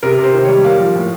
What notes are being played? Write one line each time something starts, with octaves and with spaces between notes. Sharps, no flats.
C3 A#4
C3 C5
D#3
G3 C#5
A#3 F5
F3
A2